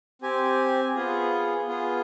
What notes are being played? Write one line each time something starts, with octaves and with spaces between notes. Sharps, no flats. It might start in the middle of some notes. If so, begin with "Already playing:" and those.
C4 G4 G#5
B3 F4 G#4
B3 F4 G#4